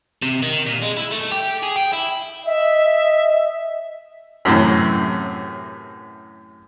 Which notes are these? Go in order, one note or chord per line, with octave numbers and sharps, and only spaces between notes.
C3
D#3
A#2
G#3
E4
A3
G4
G#4
G5
E4
D#5 E5
F#2 A2 C3 E3